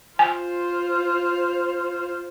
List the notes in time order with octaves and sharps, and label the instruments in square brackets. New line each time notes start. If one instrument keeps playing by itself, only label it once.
[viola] F4 C5 [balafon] G#5